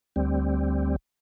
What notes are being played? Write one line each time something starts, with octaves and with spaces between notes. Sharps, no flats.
D2 G3 C4